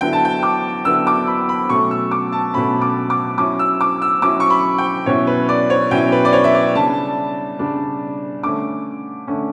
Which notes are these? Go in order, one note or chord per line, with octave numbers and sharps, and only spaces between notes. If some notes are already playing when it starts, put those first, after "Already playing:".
D3 F#3 B3 E4 G5
A5
G5
D6
D3 F#3 B3 E4 E6
D6
B5
B5
B2 F#3 A3 C#4 C#6
E6
D6
A5
B2 F#3 A3 C#4 B5
D6
D6
F#3 C#4 E4 D6
E6
D6
E6
F#3 C#4 E4 D6
C#6
B5
G5
B2 F#3 C#4 E4 C#5
B4
D5
C#5
B2 F#3 C#4 E4 G5
B4
D5
C#5
E5
D5
C#3 G3 D4 A5
C#3 G3 D4
D3 A3 C#4 D6
D3 A3 C#4